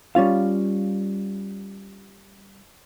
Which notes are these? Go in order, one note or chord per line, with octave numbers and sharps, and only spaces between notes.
G3 C#4 F4 F5